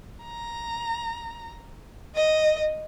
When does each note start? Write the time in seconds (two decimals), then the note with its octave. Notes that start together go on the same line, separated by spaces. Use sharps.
0.25 A#5
2.16 D#5